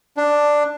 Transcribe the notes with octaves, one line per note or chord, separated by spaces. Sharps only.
D4